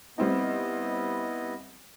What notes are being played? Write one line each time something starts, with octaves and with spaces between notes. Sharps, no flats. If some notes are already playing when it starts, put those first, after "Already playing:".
G3 B3 C4 D#4 E4 D#5